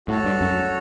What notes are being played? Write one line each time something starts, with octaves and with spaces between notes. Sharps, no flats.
A2 F#4 A4 C#5
G2
F#2